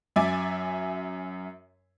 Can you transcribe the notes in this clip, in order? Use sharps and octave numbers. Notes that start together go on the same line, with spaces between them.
F#2 E5 G#5 D6 A6